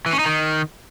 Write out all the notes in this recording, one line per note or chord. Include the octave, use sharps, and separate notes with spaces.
E3
C#4
D#4
D#3